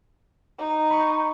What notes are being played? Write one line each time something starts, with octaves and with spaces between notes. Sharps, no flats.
D#4
B5 C#6 C#7